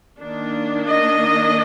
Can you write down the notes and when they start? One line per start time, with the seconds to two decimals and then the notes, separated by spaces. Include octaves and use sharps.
0.20 D#3 A#3 D4
0.88 D#5